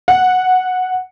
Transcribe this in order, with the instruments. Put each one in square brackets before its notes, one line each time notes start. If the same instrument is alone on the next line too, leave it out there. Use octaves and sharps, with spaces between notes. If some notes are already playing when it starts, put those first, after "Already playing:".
[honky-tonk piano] F#5